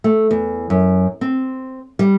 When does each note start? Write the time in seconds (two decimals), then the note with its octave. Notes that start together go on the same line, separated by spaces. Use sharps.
0.04 A3
0.31 E2
0.70 F#2
1.21 C4
1.99 G3